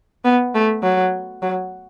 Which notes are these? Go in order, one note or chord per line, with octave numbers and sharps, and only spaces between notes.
B3
A3
F#3
F#3